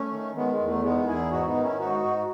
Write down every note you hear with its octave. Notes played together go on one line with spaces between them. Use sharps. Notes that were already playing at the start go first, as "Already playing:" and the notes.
Already playing: A3 C#4
D#3
D#3 G#3 B3
G#3
E2
A3
D#3 G#3 B3
E2 E4 G#4
G#2 D#4 F#4
B3 D#4
D#3
C#4 E4
G#2 D#4 F#4
G#2